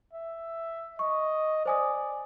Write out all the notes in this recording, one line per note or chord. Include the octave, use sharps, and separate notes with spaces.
E5
D#5 C#6
C5 D5 G#5 D#6